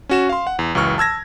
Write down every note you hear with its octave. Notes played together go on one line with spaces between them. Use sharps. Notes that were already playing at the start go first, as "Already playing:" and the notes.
C#4 F#4 E7
F5 C6
F#5
E2
C#2 F#2 E3 C#6 F6
A5 E6 G#6 A#6